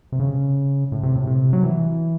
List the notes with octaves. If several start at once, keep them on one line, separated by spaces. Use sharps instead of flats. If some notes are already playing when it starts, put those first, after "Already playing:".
C3
C#3
A2
C3
A2
C3
F#3
E3